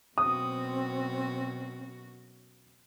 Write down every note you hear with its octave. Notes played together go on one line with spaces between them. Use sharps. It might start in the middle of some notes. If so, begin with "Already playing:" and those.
F#2 B2 C4 F#4 D#6